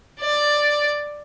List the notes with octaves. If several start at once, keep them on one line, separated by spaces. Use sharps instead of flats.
D5